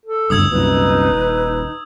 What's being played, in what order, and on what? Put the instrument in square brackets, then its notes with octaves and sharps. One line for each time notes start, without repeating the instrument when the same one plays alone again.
[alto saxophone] A4
[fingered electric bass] F#1 D2 G2 [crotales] D#6 E6 G#6
[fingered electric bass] C2 F#2 A#2 [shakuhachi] D#4 [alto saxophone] B4
[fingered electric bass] D#1